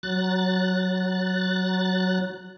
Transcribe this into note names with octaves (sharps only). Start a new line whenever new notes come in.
F#3 F#6 A6